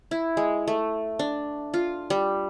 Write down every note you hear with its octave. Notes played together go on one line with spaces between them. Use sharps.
E4
G#3
A3
D4
F4
G3